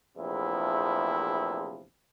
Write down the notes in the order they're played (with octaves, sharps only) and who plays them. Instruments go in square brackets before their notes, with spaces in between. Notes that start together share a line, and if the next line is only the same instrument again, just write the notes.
[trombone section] A#1 E2 C3 F3 A3 E4